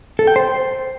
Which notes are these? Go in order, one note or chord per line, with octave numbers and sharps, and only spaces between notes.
A4
G5
C5